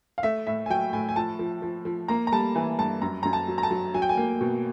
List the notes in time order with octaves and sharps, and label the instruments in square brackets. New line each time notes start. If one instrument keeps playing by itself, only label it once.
[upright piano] F5
A3 E5
A2 E5
G#5
F#3 G5
A2 G#5
G#5
F3 A5
F3
F3
F3
A#3 A#5
A#5
G3 A5
E3 G#5
G2 A5
F#2 A#5
F#2 A#5
A5
F#3
A#5
A5
F#3
F#3 G#5
G5
G#5
A#3
B2